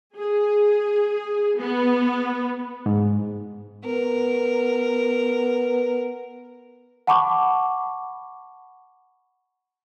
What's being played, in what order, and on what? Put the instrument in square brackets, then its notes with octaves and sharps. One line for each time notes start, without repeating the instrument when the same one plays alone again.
[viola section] G#4
B3
[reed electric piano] G#2
[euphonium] B3 [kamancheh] A#4
[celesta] F#5 A5 B5 C#6 D6